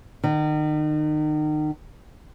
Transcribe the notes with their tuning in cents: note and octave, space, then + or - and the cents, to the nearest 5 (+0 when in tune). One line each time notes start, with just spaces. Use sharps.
D#3 -35